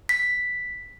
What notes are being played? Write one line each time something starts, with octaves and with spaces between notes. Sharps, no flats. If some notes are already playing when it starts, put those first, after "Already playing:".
B6